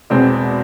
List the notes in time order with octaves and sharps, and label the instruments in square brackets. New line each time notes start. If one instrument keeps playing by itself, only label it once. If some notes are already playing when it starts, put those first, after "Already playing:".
[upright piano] E2 B2 G#3 C4